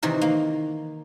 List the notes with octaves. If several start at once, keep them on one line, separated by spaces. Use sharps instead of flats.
C3 D#3 E3 A#4
A#3